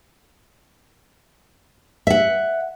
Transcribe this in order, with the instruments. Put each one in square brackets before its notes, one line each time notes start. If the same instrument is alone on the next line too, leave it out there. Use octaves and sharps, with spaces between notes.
[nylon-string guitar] E5 F#5